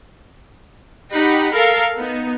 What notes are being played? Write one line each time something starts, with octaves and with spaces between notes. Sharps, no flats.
D#4 G4 F#5 B5
A4 A#4 F5
B3 D#4